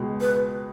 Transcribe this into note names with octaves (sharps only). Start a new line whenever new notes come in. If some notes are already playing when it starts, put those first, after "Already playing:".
Already playing: C#2 B2 G#3
B4